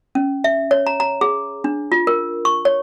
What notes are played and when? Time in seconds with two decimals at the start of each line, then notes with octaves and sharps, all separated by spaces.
0.15 C#4
0.44 E5
0.71 C#5
0.87 A#5
1.00 A#5
1.21 G#4
1.64 D4
1.92 F4
2.07 A#4
2.45 C#6
2.65 C#5